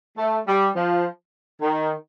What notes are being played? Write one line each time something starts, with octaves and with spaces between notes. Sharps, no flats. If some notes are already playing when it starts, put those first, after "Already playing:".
A3
G3
F3
D#3